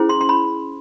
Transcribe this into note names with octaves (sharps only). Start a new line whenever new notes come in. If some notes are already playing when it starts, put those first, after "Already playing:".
Already playing: C#4 E4 G#4 C5
C6
C6
B5